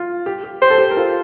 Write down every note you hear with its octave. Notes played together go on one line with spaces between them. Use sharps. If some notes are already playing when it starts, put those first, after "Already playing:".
Already playing: F4
G4
G4
G4 C5
A4
G4
A#4
F4 A4